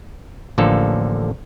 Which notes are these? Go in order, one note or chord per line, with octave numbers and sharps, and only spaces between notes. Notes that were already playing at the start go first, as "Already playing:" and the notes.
A1 D3 F3 A#3 A4